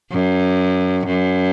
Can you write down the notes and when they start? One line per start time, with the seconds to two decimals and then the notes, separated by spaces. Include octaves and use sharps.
0.12 F#2
1.07 F#2